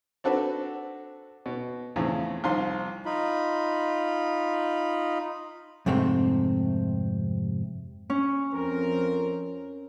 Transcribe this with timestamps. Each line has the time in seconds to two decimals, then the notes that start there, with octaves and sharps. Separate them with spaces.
0.24 C4 D4 F#4 A4 B4
1.46 B2
1.96 E2 A2 C#3 F3 C4
2.44 C2 D#3 F3 C6
3.06 D#4 F4 B5
5.86 F2 G#2 C3 A3 C4
8.10 C#4
8.53 F2 C4 A#4